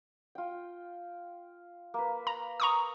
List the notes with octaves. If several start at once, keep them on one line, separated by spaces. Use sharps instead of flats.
F4 G5
A#3 B4
A#5
A#5 C#6 D#6